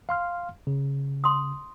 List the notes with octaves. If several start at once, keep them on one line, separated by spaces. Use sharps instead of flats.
F5 C6 F6
C#3
C6 D#6